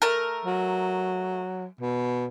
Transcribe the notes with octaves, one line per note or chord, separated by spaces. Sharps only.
A3 A#4
F#3
B2